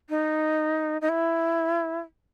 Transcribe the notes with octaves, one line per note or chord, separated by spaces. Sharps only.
D#4
D#4
E4